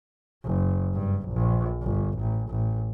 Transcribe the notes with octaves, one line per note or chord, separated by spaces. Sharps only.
F#1
G2
A#1
G1
A1
A1